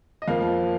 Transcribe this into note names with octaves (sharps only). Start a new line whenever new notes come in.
D#5
F2 F3 A#3 F5